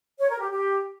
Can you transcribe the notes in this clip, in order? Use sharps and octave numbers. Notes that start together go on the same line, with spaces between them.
C#5
A#4
G4
G4